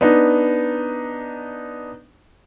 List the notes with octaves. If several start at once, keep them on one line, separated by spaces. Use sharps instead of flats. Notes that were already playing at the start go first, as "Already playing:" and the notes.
B3 D4 D#4